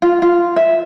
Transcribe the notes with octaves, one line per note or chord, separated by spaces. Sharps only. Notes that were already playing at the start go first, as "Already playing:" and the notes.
F4
F4
E5